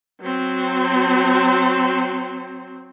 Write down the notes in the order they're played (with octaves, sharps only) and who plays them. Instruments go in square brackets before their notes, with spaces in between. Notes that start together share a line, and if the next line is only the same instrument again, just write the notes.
[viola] F#3 C4